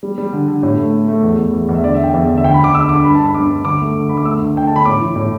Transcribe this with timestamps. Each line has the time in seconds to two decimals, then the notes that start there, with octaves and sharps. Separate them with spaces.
0.03 G3
0.18 G3
0.33 D3
0.48 D3
0.63 A2
0.78 A3
0.93 A3
1.08 A3
1.23 E2
1.38 E2
1.53 E2
1.69 E2
1.75 E5
1.83 D3 D5
1.94 E5
1.99 D3 G5
2.14 E2 E5
2.29 D3
2.37 E5
2.44 D2 G5
2.54 B5
2.59 D2 D6
2.74 D2 E6
2.89 D3 D6
3.04 G2 B5
3.15 A5
3.20 G2 B5
3.35 G2 D6
3.50 G2
3.65 D2 D6
3.80 A3
3.94 D2
4.09 D2 B5
4.17 D6
4.25 A3 E6
4.40 D2
4.56 D2 G5
4.67 D3 A5
4.76 B5
4.85 A2 D6
5.00 E3
5.16 A2